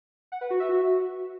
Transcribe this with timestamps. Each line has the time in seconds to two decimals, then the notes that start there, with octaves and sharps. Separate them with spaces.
0.32 F#5
0.41 B4
0.50 F#4
0.60 E5
0.69 F#4